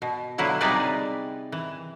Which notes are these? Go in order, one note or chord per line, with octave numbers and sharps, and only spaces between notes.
B2
D3 F#3 B3 E4 F5
C3 G3 D#4 G#4 B4 D5
E3